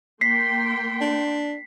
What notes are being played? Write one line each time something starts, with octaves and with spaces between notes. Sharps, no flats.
A#3 G5 C6 B6 C7
D4